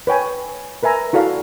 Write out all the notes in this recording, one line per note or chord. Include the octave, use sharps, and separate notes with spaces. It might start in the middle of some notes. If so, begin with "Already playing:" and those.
B4 C#5 G5 G#5
A#4 B4 E5 G#5 A#5
E4 F#4 A4 D5 F5